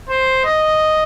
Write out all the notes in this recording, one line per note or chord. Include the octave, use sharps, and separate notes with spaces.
C5
D#5